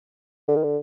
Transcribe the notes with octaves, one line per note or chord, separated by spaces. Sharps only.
D3
D#3
D3